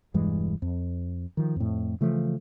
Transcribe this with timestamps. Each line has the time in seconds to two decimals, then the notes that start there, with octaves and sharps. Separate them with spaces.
0.14 E1 G2 E3 G#3
0.62 F2
1.37 D#3 F3
1.56 F2 A2
2.01 C#3 E3 F3 A3